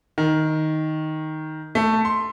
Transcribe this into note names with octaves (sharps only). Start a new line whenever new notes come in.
D#3
A3
C6